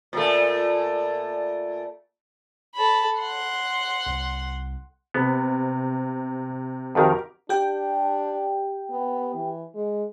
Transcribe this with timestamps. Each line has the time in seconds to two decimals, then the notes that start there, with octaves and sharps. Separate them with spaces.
0.13 A#2 A3
2.75 A4 B5
3.18 F#5 C6
4.06 C2
5.14 C3 B3
6.95 F2 D#3 F#4 G4 A#4
7.49 D4 G4 G5
8.90 B3
9.34 E3
9.74 G#3